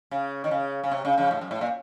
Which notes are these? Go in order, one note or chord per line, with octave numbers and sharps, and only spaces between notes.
C#3
D#3
C#3
C#3
C3
C#3
C#3 F3
A2
F#2
A2
A#2